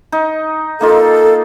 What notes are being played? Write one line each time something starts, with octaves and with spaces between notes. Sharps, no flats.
D#4
A#3 D#4 F4 A4